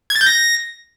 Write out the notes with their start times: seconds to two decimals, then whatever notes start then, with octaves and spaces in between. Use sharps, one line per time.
0.10 G#6
0.16 A6
0.21 G6
0.26 A#6